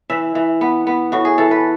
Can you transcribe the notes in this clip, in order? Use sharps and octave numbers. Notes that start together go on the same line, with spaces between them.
E3 E5
E3
B3
B3
A2 F#4
G#4
E3 A4
B4